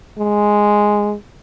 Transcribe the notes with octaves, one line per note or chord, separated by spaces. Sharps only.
G#3